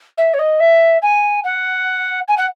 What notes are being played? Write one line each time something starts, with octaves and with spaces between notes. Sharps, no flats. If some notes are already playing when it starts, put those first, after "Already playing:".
E5
C#5
D#5
E5
G#5
F#5
G#5
F#5